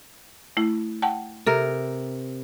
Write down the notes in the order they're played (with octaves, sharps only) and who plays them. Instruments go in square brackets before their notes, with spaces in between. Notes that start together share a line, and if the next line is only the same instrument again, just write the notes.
[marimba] A3 E4
F#5 G5 A5
[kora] C3 A#4 [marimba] A4